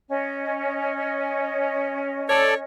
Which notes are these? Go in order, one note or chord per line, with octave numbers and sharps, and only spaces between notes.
C#4 D#5
A4 C#5 D5